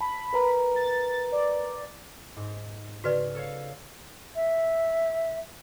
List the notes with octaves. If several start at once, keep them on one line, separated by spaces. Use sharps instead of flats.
A5 B5
A#4 B4 A#5
A6
D5
G#2
C#3 F#4 B4 D5 F6
A4 C#5 F5
E5